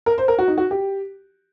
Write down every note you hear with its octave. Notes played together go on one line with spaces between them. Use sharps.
A#4
C5
A#4
F#4
D#4
F#4
G4